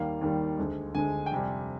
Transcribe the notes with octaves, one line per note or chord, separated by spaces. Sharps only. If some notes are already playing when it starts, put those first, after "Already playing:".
Already playing: D#2 D#3 G3 A#3 F5
D#2 D#3 G3 A#3
D2 D3 G#3
D2 D3 G#3 G#5
G5
F2 C3 G3 G#5